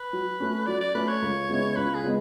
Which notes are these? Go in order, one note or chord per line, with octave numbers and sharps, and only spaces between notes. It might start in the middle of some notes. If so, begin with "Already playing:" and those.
Already playing: B4
F#3
A3 C#4
F#3 D5
D5
A3 C#4 B4
C#5
C#2
C#3 G#3 B3 E4
C#2 B4
G#4
C#3 G#3 B3